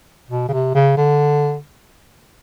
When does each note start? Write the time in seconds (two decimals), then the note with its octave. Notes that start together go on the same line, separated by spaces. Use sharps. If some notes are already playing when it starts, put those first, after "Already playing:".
0.30 B2
0.48 C#3
0.52 C3
0.74 C#3
0.97 D3